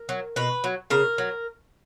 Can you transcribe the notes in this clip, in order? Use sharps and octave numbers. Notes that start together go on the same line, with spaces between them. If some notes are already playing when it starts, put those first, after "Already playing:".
Already playing: A#4
F#3
B2 B4
F#3
C#3 A#4
F#3